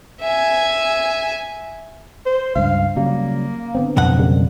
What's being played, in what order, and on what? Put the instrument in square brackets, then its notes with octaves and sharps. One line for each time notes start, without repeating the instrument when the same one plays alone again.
[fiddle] E5 G#5
[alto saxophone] C5
[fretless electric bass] C#2 G2 [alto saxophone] F5
[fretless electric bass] C#3 F#3 G3 [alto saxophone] A#3
[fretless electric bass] D3 B3 C4
[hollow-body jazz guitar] B1 F2 F#5
[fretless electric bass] C#3 G3 A#3